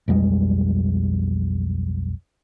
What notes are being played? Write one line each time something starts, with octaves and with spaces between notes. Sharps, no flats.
B1 F2 G3 G#3